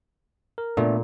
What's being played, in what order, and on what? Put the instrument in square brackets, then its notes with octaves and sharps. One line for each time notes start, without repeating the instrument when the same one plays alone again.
[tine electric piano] A#4
[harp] A#2 [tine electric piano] A3 B3 D4